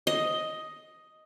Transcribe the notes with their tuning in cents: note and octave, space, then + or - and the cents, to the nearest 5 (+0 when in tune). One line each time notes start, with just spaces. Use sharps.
D#5 +5